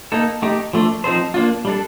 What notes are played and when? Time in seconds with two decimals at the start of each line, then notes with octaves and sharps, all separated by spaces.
0.12 A#3 D#4 A4
0.42 A3 D#4 G4
0.73 F3 A3 D4
1.04 F3 C4 D#4 A4 C5
1.34 A#3 D4 F4
1.65 G3 D4 A4